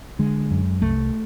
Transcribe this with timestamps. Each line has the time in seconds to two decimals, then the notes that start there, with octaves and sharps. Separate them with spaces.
0.19 D3 G#3
0.51 F#2
0.82 C2 A3